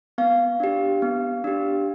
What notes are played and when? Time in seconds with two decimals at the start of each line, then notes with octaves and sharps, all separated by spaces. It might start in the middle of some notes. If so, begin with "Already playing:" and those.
0.18 B3 F5
0.60 D4 G4
1.02 B3
1.44 D4 G4